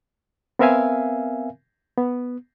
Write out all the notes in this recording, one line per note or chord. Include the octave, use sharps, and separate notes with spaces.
B3 C4 A#4 E5 F5 G#5
B3